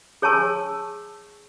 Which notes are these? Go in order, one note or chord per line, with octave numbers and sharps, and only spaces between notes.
G#4 C#5 G#5 A5 C#6 E6